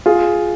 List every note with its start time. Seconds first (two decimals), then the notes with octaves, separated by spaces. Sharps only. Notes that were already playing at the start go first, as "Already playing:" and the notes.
0.06 F4 G#4